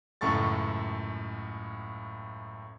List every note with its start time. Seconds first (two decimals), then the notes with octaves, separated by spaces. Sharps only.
0.21 C#2 F#2 A2 A4 C#6 A6